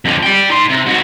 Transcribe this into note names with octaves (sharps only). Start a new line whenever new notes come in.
F2 D3
D5 G5
D#4 C6
C3
G#2 F#4